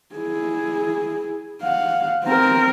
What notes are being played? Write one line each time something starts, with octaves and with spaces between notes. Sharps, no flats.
E4 G#4
F5 F#5
C4 A#4